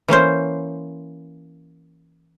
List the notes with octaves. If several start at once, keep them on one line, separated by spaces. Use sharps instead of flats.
E3 A#3 C#4 C5